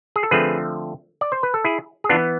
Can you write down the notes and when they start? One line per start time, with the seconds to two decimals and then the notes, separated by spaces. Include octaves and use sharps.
0.16 G#4
0.23 A4
0.31 D3 F3 A3 C4 G#4 B4
1.21 D5
1.32 C5
1.43 B4
1.54 A4
1.64 E4 G#4
2.04 G#4
2.09 B3 D4 F4
2.12 E3